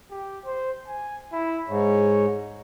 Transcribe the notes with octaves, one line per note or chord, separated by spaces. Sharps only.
G4
C5
G#5
E4
G#2 C#5